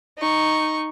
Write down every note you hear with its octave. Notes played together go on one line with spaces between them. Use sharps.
D#4 C#6